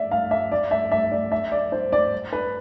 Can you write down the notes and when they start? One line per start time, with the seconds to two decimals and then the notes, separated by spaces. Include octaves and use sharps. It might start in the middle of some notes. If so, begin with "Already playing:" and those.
Already playing: D5 E5
0.11 F5
0.31 E5
0.52 D5
0.71 E5
0.92 E5
1.11 D5
1.32 E5
1.52 D5
1.72 C5
1.92 D5
2.33 B4